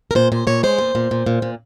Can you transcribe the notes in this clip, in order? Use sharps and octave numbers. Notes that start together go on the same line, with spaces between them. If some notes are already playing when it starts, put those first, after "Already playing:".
A#4
A#2 C5
A#2 C5
A#2 C#5
G#3 C5
A#2
A#2
A#2
A#2
A#2